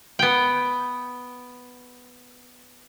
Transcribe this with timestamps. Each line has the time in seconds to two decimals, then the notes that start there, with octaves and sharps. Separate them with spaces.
0.19 B3 G5